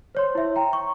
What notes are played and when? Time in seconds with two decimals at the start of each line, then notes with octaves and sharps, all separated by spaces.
0.15 C5 C#5 C6
0.35 E4 E5
0.56 G5 A#5
0.73 C#6